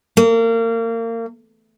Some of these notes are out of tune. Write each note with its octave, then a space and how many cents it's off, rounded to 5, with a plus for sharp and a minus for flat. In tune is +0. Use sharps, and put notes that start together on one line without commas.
A#3 -30